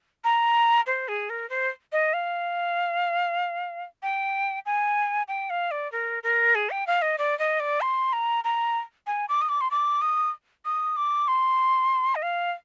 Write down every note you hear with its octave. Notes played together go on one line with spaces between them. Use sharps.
A#5
C5
G#4
A#4
C5
D#5
F5
G5
G#5
G5
F5
D5
A#4
A#4
G#4
G5
F5
D#5
D5
D#5
D5
C6
A#5
A#5
G#5
D6
D#6
D6
C6
D6
D#6
D#6
D6
C6
D#5
F5